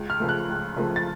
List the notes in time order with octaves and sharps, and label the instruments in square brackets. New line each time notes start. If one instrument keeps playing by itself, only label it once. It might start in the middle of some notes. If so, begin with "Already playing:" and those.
Already playing: [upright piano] C#2
F6
C#3 F3 A3
F#6
C#2
C#3 F3 A3
A6